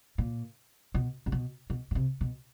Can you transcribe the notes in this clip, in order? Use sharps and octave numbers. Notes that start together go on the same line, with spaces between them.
A#2
B2
C3
B2
B2
B2
C3
B2